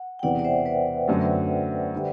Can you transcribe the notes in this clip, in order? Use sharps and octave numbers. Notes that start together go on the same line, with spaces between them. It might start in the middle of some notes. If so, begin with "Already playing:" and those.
Already playing: F#5
G5
E1 E2 C3 E3 D5 F#5
D5
C5 E5
B4 D5
F#2 D3 F#3 A3
D3 G3 D4